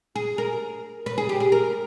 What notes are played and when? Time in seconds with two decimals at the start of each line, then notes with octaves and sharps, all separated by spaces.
0.16 G#4
0.38 A#4
1.06 B4
1.18 G#4
1.29 G4
1.40 G#4
1.52 A#4